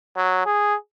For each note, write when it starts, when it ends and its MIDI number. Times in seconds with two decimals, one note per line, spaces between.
0.17 0.41 54
0.46 0.75 68